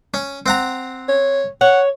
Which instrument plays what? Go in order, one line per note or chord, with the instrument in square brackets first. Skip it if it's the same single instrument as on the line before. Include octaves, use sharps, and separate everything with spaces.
[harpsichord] C#4
C4 F#5 A#5
[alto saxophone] C#5
[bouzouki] C#5 [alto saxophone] F#5